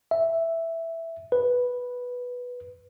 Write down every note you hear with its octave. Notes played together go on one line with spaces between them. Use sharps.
E5
B4